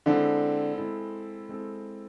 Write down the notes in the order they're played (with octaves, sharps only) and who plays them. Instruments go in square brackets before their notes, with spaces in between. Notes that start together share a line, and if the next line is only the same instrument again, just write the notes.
[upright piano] D3 [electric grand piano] G#3 C4 E4 A4
[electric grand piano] G#3 C4 E4 A4
G#3 C4 E4 A4